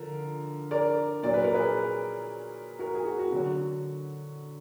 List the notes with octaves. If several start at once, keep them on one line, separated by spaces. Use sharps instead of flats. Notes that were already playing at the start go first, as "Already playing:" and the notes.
Already playing: D3 F3 A#4
A#4 D5
A#2 F#3 D5
B4
A#4
G#4 B4
F#4 A#4
G#4
F#4
F#4
D3 F#3 F#4